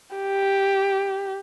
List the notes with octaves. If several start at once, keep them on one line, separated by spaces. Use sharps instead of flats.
G4